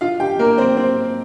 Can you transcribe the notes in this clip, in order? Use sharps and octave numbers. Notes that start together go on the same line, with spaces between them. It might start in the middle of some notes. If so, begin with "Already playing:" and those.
F4 F5
G4 G5
A#3 A#4
C4 C5
C4 C5